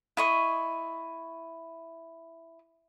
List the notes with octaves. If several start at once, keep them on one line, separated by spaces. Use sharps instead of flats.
E4 D#5 C#6